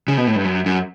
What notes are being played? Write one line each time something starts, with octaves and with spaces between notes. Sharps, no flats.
C#3
B2
A2
G2
F#2
F#2